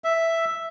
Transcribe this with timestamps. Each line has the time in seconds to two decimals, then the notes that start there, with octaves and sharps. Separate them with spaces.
0.04 E5